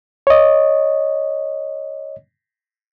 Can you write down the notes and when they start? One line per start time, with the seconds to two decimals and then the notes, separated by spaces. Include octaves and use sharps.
0.27 C#5 D#5